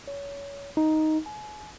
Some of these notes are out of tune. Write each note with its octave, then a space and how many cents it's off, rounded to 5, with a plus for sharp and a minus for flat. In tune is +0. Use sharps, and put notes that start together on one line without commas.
C#5 +25
D#4 +5
G#5 +35